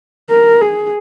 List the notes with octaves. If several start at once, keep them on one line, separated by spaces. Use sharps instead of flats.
A#4
G#4